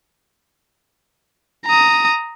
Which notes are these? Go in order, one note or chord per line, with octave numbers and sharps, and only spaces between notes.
A#5 D#6